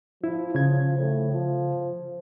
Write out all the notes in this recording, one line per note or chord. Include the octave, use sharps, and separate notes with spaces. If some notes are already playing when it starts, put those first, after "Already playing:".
F3 E4
C#3 G#6
A2
F3